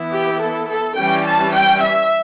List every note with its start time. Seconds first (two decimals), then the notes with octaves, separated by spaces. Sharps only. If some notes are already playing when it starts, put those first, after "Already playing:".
Already playing: E3 B3 E4
0.12 G4
0.40 A4
0.69 A4
0.97 E3 G3 C#4 G5
1.24 A5
1.53 G5
1.81 E5